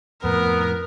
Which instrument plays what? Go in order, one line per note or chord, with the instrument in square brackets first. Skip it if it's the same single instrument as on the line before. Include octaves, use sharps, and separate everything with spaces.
[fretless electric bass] F2 A2 [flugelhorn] B3 [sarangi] A#4